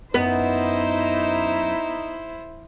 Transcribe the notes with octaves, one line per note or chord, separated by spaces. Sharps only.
F#2 B3 D#4 E4 C5